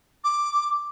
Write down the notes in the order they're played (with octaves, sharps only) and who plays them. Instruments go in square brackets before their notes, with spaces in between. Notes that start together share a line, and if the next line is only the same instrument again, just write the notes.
[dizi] D6